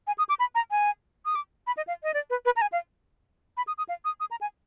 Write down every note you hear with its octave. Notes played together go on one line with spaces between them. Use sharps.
G#5
D#6
D6
B5
A#5
G#5
D#6
D6
B5
D#5
F5
D#5
D5
B4
B4
A#5
G#5
F5
B5
D#6
D#6
F5
D#6
D#6
A#5
G#5